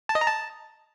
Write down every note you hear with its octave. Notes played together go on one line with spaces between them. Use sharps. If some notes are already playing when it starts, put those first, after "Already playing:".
A5
D#5
A#5
A5